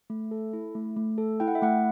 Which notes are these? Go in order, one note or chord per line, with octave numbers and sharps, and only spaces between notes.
A3
A4
E4
A3
A3
A4
E4 G5
F#5
E5
A3 F#5